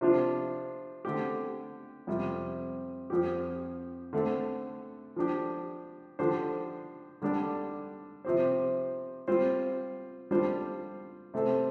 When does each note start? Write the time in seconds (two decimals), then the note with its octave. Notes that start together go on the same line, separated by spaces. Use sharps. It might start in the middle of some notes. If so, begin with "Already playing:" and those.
0.01 C3 F3 D4 F4 C5
1.05 D3 A3 C4 G4
2.07 F2 C3 G3
3.10 F2 F3 C4 G4
4.13 D3 A3 C4
5.16 F3 D4 G4
6.19 D3 F3 D4 G4 C5
7.22 D3 G3 D4 A4 D5
8.25 C3 F3 C4 G4 C5
9.28 G3 C4 F4 C5
10.31 G3 D4 F4 C5
11.34 C3 A3 C4 A4